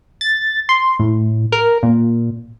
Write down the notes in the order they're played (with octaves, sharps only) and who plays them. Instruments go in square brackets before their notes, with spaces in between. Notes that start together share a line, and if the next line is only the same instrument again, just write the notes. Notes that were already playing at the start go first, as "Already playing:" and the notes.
[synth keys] A6
C6
A2
A#4
A#2